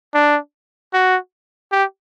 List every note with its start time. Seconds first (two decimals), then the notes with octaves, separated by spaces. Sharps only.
0.14 D4
0.94 F#4
1.72 G4